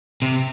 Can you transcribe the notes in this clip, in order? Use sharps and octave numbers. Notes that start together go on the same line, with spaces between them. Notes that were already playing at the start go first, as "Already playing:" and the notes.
C3